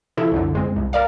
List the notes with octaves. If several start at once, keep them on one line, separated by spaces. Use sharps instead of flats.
C3 F3 E4 A4
C2 F#2 D3
G1 G#3 C4
C2
A#4 D5 F5